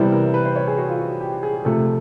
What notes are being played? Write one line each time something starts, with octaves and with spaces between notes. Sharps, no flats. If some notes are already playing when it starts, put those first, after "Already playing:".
Already playing: C3 E3 G3 B3 E4 C5
A#4
B4
C5
C#5
G#4
F#4
F4
F#4
G4
G#4
C3 F3 A3 A4